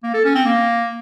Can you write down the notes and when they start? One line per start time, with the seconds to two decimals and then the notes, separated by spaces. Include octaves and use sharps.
0.04 A#3
0.14 A4
0.24 C#4
0.35 C4
0.45 A#3